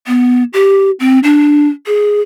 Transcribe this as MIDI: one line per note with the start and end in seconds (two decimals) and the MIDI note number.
0.07 0.44 59
0.53 0.91 67
1.00 1.19 60
1.24 1.67 62
1.87 2.21 68